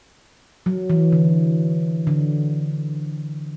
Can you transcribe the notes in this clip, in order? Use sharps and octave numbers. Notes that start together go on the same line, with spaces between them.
F#3
E3
D3
D3